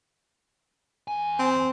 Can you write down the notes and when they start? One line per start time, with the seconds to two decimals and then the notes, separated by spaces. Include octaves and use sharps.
1.08 E2 G#5
1.39 C4